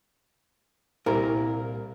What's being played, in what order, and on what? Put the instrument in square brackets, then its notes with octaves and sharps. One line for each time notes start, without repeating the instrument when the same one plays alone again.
[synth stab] C2 [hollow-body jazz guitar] A#2 A#4